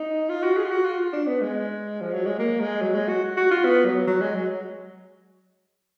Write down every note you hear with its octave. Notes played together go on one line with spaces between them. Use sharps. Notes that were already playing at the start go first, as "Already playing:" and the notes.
Already playing: D#4
F4
F#4
G#4
F4
F#4
F4
D4
B3
G#3
F3
F#3
G#3
A#3
G#3
F#3
G#3
F#4
F#4
F4
B3
F#3
F#3
G#3
F#3